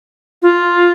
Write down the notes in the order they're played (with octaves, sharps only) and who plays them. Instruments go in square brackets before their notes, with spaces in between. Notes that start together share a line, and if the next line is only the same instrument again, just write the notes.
[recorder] F4